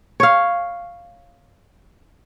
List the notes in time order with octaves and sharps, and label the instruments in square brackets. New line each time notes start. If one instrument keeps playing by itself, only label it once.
[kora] C#5 F5